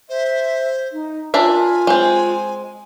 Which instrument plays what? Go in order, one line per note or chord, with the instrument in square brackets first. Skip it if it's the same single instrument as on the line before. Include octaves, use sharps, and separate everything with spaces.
[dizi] C5 [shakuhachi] E5
[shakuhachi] D#4
[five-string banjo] D4 A#4 E5 [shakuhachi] F4 [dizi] G#5
[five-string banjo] G#3 C4